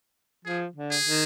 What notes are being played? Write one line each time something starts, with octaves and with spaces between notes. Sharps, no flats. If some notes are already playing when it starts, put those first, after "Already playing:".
F3 G#4
D3
G#4
D#3